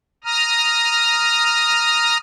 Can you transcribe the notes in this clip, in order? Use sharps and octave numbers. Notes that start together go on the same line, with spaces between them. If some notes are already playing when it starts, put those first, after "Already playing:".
A#5 D#6 F6